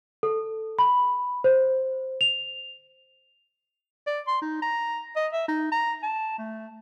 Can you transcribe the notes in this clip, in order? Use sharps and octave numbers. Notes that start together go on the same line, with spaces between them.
A4
B5
C5
F7
D5
C6
D#4
A#5
D#5
E5
D#4
A#5
A5
A3